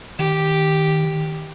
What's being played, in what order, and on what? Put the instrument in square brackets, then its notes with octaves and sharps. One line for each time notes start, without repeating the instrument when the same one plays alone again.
[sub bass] D#3 [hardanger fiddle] G4